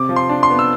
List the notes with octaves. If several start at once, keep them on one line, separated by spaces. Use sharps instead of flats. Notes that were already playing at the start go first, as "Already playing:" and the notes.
Already playing: C3 D6
F3
C6
D4
C6
B3
E6